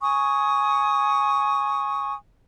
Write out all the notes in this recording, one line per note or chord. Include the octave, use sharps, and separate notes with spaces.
G#5 C#6 D#6